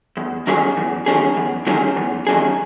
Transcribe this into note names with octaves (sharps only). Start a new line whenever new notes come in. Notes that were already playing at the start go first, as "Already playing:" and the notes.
E2
D#3 F#3 C#4 G#4
E2
D#3 F#3 C#4 G#4
E2
D#3 F#3 C#4 G#4
E2
D#3 F#3 C#4 G#4